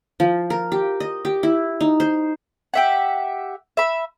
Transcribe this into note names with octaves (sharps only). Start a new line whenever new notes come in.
F3
A#4
G4
D#5
G4
E4
D#4
C5
G4 E5 F#5
E5 B5